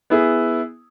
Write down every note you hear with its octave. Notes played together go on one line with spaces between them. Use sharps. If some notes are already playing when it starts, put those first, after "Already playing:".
B3 E4 G#4